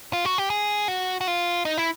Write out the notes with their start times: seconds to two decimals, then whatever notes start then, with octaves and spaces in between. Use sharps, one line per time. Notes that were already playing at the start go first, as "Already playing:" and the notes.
0.13 F4
0.25 F#4
0.38 G4
0.50 G#4
0.88 F#4
1.21 F#4
1.28 F4
1.65 D#4
1.78 E4